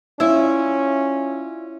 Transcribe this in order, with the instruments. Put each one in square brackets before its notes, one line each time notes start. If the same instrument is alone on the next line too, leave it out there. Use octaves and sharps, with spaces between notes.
[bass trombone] C#4 [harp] E4 [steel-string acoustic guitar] F4 D5 E5